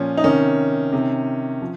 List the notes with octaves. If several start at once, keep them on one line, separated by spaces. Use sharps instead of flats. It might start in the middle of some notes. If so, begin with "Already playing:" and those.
Already playing: A#2 F3 C#4
D#4
C3 D#3 C#4
C3 D#3
F3